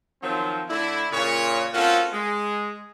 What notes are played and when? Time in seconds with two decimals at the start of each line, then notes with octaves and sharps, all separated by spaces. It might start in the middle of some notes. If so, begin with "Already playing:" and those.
0.22 D#3 F3 F#3 C4
0.69 D3 A3 D4 E4
1.11 A#2 C#3 C#5
1.73 A#3 C4 C#4 F4 F#4 A4
2.12 G#3